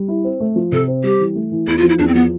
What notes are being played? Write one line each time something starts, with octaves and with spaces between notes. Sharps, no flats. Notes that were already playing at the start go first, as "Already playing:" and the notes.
Already playing: G3
E4
C4
A3
F3
C3 A4
C4
G3 G4
E3
A3
E3
E2 E4
F4
F3
E4
E2 D4
C4
F3 B3